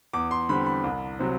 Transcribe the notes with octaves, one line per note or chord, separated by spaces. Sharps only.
E2 D6
C6
D3 G3 C4 B5
B5
C2
C3 F#3 C4